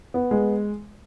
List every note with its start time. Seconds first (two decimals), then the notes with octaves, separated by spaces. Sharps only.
0.14 B3
0.31 G#3